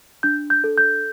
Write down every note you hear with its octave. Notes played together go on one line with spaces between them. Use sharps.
D4 G6
G6
A4
G6